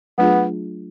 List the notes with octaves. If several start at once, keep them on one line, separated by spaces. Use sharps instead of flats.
F#3 A3 B3 D4 F4 G#4